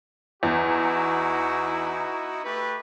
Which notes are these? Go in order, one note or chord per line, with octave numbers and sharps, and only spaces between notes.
E2 D#4 E4 F#4
A3 G4 B4